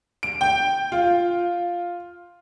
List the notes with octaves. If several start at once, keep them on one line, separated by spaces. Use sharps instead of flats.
D7
G5
F4